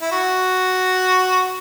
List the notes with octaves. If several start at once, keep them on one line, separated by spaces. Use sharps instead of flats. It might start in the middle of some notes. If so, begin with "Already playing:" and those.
E4
F#4